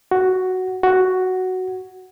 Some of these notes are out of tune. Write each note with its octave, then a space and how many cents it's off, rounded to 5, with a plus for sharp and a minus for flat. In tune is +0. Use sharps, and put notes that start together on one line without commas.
F#4 +5
F#4 +5